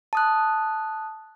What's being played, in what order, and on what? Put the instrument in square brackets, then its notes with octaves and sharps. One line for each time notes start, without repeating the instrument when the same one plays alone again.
[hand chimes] A5 D#6 F#6